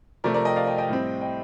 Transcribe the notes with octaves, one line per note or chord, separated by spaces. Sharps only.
C3 F3 A3 A#4 D5
A#4 D5
D#5 G5
D5 F5
D#5 G5
D#5 G5
A2 G3 C4
D#5 G5